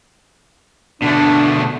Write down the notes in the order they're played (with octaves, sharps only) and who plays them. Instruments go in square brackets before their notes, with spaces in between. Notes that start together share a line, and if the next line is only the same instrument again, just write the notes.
[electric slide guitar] B2 D3 A3 [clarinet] D4